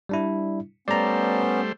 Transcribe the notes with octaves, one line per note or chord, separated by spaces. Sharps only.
G3 D4 E4
G3 A3 B3 C#4 C5 D5 A#5